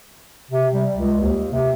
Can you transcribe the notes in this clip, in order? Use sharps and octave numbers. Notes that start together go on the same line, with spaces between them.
C3
G3
C#2
D#2
C3